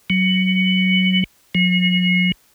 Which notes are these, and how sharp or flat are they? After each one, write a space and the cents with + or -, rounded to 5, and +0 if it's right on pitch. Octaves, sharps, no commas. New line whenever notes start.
F#3 +15
F#3 -40